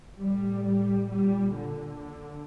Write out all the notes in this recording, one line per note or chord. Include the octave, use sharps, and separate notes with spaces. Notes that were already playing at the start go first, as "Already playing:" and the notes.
A2 G3
G3
A#2 G3
D3